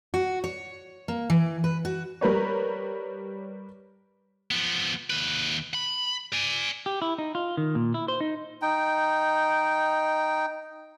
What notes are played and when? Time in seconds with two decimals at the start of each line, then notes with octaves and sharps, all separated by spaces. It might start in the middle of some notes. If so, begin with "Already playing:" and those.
0.14 F#4
0.44 C#5
1.08 A#3
1.30 E3
1.64 B4
1.85 F#4
2.21 G3 A#4 B4 C#5
4.51 F3 B3
5.10 D#2 B4
5.74 B5
6.33 D5 G#5
6.86 G4
7.02 E4
7.18 D#4
7.35 F4
7.57 D#3
7.75 A#2
7.94 E4
8.08 C5
8.21 D#4
8.62 D#4 G5